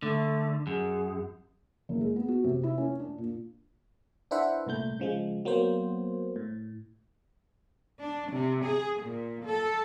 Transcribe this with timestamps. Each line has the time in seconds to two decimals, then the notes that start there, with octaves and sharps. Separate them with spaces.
0.03 D3 A3
0.67 F#2 G#4
1.89 F#1
2.01 G#3
2.16 B3
2.28 F#4
2.44 C3
2.63 E4
2.78 C#4
3.00 D4
3.18 A#2
4.31 D4 E4 B4 C5 E5 F#5
4.67 C2 A#2 A3 G6
5.00 C#3 F3 G#3
5.45 F#3 A#3 B3 C5
6.36 A2
8.00 D4
8.31 C3
8.65 G#4
9.02 A#2
9.45 A4